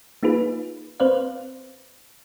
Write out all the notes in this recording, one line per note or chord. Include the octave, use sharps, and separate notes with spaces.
A#3 D#4 F4 G#4 B4
C4 B4 C5 D5 F5